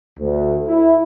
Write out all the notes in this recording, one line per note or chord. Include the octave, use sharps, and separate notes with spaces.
D2
E4